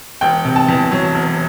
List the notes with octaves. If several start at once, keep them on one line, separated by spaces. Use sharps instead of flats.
E1 G5
C3
A5
E2
F#3
E1